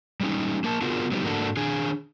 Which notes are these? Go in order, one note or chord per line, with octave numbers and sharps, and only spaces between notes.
G3 G#3 C#4 D#4
A#3 A#4 A5
B3 F4 F#4 G#4 A#4
F#3 G3 B3 D#4 G4
G#2 A#3 D4 F#4 A4
D#3 D4 G#4 G#5